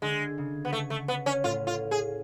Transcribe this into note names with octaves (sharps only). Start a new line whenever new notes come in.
D3 G#3
C#3
B3
A3
A3
B3
C#4
A2 F4
F4
G#4